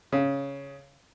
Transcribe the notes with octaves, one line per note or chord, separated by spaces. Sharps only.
C#3